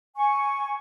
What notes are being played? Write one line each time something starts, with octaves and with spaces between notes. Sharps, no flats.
G#5 C#6